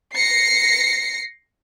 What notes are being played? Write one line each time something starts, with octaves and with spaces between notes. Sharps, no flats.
A#6 C7 C#7